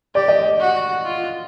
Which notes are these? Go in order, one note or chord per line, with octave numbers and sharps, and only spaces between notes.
G4 D5
D#5
D5
F#4
F4